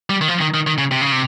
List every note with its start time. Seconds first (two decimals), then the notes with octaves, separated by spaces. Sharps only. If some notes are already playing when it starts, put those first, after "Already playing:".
0.10 G3
0.21 D#3
0.28 F3
0.41 D#3
0.54 D#3
0.67 D#3
0.78 C#3
0.91 C3
1.01 C#3
1.12 C3